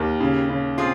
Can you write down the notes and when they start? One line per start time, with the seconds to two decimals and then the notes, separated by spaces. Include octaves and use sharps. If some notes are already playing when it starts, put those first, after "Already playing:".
Already playing: D#2 G4 A#4
0.20 C#3
0.50 C#3
0.78 C4 F4 G#4